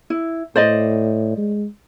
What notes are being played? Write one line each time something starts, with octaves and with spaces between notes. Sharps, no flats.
E4
A2 C5 D5 D#5
G#3